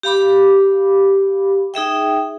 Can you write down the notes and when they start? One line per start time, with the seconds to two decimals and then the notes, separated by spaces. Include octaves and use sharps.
0.03 G4 F5 B5 D6
1.74 D#4 G#4 E5 G5